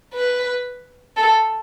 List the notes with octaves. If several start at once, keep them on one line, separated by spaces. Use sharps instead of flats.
B4
A4